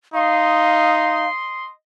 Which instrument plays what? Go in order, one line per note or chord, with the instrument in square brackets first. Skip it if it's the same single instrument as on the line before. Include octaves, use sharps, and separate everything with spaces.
[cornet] D#4 [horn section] D#5 C6 [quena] F5